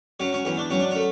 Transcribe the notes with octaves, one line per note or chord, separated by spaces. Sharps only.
F#3 C#4
C#4
E2 C#4
D4
F#3 C#4
D4
C#4
A3